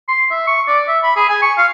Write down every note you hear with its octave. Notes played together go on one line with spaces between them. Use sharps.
C6
E5
C#6
D5
E5
B5
G#4
G#5
C#6
F5